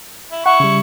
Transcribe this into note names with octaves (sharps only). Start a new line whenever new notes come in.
E4
E4 F#5 C#6
C#3 G3